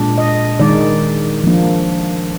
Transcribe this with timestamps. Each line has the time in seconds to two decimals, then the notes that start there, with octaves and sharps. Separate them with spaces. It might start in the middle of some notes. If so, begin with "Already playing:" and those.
Already playing: A#2 G#3 D4
0.18 D#5
0.60 D#3 G#3 D#4 D5
1.44 F3 A#3 D4